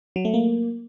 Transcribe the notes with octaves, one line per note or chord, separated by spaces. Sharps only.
F#3
A3
A#3